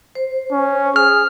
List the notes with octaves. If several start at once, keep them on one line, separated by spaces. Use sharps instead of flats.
C5
C#4
G#4 F6